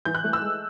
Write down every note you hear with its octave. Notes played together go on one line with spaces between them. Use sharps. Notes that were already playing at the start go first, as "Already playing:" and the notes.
E3 G6
F#6
A3
E6
G#3